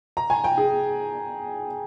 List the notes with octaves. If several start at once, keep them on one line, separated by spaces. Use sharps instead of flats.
A#5
G#5
G5
G#4